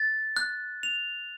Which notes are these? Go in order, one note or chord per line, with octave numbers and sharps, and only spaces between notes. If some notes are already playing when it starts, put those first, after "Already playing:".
Already playing: A6
F#6
F7